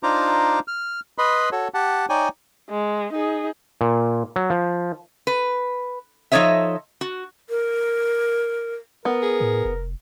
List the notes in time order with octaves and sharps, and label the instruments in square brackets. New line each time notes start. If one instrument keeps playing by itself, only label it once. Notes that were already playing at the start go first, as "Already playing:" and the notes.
[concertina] D4 D#4 F4 C5 A#5 D6
F6
B4 D#5 B5 C6
F#4 A4 C#5
G4 F#5 A5
D#4 C#5 D5 G5 G#5
[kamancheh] G#3
D#4 G#4
[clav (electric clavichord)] A#2
F#3
F3
[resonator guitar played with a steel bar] B4
F3 D#4 A4 C#5 D#5 E5
F#4
[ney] A#4
[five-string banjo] B3 [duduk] A#4
[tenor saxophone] G#4
[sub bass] A2
F1